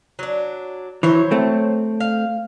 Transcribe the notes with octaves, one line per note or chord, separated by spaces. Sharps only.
F#3 D4
E3 F#3 C5 C#5
A3 C4
F5